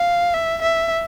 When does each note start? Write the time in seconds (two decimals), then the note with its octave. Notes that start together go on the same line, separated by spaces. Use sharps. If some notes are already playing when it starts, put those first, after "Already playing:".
Already playing: F5
0.34 E5
0.62 E5